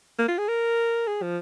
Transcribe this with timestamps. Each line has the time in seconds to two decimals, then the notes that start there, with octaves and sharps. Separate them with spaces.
0.19 A#3
0.28 F4
0.38 G#4
0.48 A#4
1.08 G#4
1.22 F3